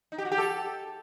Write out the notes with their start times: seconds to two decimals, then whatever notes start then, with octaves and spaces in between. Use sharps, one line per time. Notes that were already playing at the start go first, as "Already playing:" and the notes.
0.12 D#4
0.18 G4
0.25 F#4
0.32 G4
0.38 A4